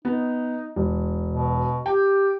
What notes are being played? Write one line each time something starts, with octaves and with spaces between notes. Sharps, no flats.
B3 D#4
E1
B2
G4 G5